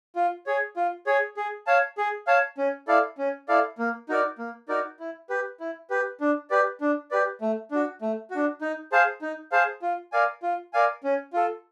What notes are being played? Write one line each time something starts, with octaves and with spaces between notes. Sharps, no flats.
F4
G#4 C#5
F4
G#4 C#5
G#4
C#5 F5 A5
G#4
C#5 F5 A5
C#4
E4 A4 D5 F5
C#4
E4 A4 D5 F5
A#3
D#4 F#4 A#4 D5
A#3
D#4 F#4 A#4 D5
E4
G4 B4
E4
G4 B4
D4
G4 B4 D5
D4
G4 B4 D5
A3
D4 F#4
A3
D4 F#4
D#4
G#4 C5 F5 A5
D#4
G#4 C5 F5 A5
F4
A#4 D5 F5 G#5
F4
A#4 D5 F5 G#5
C#4
F4 A4